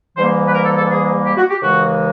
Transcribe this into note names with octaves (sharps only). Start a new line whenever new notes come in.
G#2 E3 G3 A#3 C5
B4
A#4
A4
A4
G#4
G4
F#4
G4
D#2 C#3 E3 G#3 F#4